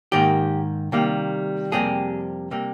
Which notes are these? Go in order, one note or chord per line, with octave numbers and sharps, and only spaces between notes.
G#2 D#3 A#3 G4
C3 D#3 G3 A#3
F2 C3 G3 A#3 G#4
C3 G3 A#3